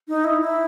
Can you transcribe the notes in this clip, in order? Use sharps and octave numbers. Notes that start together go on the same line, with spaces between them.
D#4
E4
E4